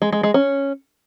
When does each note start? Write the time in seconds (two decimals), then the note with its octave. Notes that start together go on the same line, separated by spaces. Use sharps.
0.02 G#3
0.12 G#3
0.23 G#3
0.34 C#4